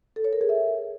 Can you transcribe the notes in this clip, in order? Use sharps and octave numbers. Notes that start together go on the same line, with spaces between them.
A4
C#5
A#4
G#4
E5